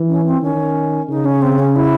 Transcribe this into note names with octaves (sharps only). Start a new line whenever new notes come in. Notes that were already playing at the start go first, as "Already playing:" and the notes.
Already playing: E3
C#4
C4
D#3 C#4
C#3 D#4
C#4
C4
C#4
E4